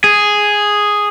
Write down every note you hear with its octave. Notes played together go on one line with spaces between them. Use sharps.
G#4